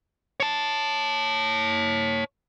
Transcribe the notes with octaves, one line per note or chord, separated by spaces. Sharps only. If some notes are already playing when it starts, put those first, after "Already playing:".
C#5 A5